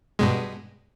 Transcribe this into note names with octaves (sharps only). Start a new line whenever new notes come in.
G2 B2 G#3